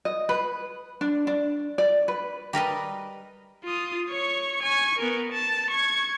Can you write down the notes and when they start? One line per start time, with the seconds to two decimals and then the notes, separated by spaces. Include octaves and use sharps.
0.05 D#5
0.29 B4
1.01 D4
1.27 D4
1.78 D5
2.08 B4
2.53 G3 A#4 B4 D#5
3.64 F4 D#6
4.10 C#5 C#6
4.63 G#5 C#6
4.98 B3 A#4
5.32 A5
5.71 C#6 G#6